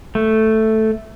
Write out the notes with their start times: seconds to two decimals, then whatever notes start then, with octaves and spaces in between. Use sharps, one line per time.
0.15 A3